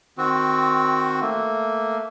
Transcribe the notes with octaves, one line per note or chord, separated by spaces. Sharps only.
D#3 C4 F#4
A3 A#3